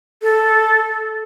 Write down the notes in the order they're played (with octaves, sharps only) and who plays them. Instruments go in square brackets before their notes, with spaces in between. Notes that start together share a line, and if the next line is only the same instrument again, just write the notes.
[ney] A4